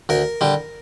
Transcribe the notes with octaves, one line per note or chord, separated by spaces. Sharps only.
D2 A#4
D3 G3